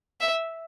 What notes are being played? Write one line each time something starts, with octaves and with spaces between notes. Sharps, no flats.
E5